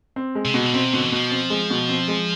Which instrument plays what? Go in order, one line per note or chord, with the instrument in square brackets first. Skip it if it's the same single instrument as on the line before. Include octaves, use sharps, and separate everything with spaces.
[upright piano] C4
G#3
[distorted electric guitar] C3
[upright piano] B2
[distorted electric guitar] D3
[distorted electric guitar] C3 [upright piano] C4
[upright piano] B2 [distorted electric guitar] D3
[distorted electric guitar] E3
[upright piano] B2 [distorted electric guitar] F3
[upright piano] C4
G#3
B2
C4
G#3